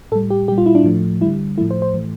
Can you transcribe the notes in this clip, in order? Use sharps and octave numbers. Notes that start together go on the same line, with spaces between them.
A2 G3 A4
G4
A#2 G3 G4
F4
E4
D4
A2 F3 A3
D3 G3 E4
A2 F3 A3 E4
C5
C5
A2 E3 A3